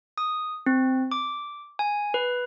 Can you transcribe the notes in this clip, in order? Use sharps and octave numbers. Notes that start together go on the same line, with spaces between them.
D#6
C4
D6
G#5
B4